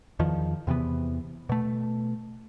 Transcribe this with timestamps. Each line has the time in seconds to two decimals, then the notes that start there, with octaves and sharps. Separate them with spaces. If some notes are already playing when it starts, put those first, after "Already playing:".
0.19 E2 D#3 F3
0.67 E2 C3 E3 B3
1.49 B2 A3